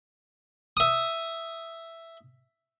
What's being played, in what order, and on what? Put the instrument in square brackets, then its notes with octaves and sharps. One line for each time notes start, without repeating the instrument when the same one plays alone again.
[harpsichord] E5 D#6